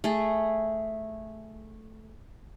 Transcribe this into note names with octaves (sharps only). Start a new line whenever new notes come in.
A3 G#4